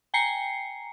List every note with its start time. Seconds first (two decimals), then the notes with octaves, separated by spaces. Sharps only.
0.14 G5 G#5 A#5 C7 C#7